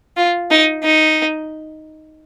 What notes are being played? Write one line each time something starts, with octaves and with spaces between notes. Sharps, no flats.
F4
D#4
D#4